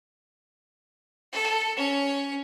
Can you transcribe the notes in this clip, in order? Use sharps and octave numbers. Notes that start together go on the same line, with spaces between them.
A4
C#4 C#5